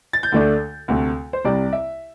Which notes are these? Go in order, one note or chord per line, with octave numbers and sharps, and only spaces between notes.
A6
G6
D2 D3 A3 D4
D2 C3 A3
C5
C2 C3 G3 D5
E5